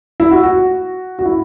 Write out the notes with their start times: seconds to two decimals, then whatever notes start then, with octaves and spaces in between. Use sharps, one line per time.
0.20 E4
0.31 F#4
0.43 F#4
1.19 F#4
1.26 E4